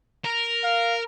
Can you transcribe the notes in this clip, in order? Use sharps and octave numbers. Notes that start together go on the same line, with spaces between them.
A#4
F5